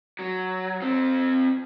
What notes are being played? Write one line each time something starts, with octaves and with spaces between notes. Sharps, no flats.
F#3
F3 C4